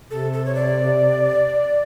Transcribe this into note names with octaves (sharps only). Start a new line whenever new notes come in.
C3 A4
A4
C#5
D5